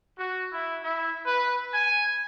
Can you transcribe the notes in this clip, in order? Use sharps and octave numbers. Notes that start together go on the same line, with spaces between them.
F#4
E4
E4
B4
G#5